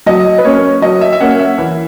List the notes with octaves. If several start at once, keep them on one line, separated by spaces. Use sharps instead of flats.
F#3 D#5
B4
A#3 C#4 C#5
F#3 D#5
E5
E5
A#3 C#4 F#5
E5
E3